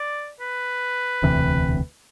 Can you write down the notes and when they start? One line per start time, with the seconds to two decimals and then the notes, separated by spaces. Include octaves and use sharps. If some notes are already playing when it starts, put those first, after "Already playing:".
Already playing: D5
0.40 B4
1.22 E1 D2 C3 E3